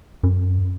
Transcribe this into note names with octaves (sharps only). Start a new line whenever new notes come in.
F#2